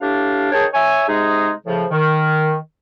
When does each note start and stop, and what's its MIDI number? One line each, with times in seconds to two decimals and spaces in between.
0.01 0.49 45
0.01 0.49 62
0.01 0.49 67
0.01 0.49 77
0.52 0.65 51
0.52 0.65 68
0.52 0.65 73
0.52 0.65 79
0.52 0.65 81
0.73 1.08 73
0.73 1.08 76
0.73 1.08 80
1.08 1.50 48
1.08 1.50 56
1.08 1.50 63
1.08 1.50 68
1.67 1.86 45
1.67 1.86 49
1.67 1.86 53
1.91 2.55 51